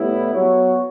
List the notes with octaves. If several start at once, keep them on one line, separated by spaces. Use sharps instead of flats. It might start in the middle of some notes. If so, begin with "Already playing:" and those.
Already playing: A2 G3 B3 E4
F#3 B3 F#4 C#5